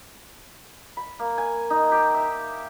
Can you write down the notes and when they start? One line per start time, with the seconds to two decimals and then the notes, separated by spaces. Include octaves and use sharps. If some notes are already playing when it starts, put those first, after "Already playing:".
0.97 B5
1.19 A#3
1.38 G#5
1.70 D#4
1.92 G4
2.14 E5